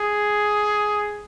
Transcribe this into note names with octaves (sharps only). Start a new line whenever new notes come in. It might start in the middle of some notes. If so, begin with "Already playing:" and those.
Already playing: G#4